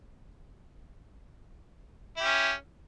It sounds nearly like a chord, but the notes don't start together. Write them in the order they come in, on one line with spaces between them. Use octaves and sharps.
E4 G4 C#4